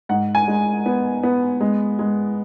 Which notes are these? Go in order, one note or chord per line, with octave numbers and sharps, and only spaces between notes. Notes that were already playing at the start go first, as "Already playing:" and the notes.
G#2 F#5
G#5
G#3
B3
B3
G#3
G#3